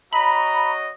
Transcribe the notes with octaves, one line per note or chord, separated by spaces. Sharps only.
F#4 C#5 D#5 A#5 B5